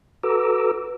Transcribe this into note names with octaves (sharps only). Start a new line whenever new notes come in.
F#4 A4 B4 A#5 D6 E6